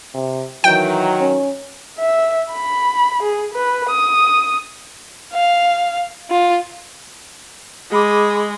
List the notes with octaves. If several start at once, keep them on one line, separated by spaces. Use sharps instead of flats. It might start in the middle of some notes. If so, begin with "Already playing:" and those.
C3
D#3 E3 F#3 G5
C#4
E5
B5
G#4
B4
D#6
F5
F4
G#3 G#4 B5 D6